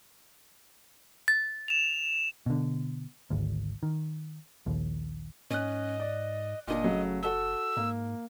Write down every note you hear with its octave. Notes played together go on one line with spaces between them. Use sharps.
A6
E7 F7
B2 D3
G#1 D2
D#3
A#1 D#2
G#2 C#4 D#5 F#6
D5
F#1 A#2 D4 D#5
C#3 F#3 A3
F#4 A4 E6 G7
G#2 A#3